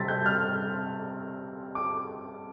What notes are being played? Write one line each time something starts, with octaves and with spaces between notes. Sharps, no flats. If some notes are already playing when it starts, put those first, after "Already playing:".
Already playing: C3 G3 C4 A6 B6
G6
F6
D6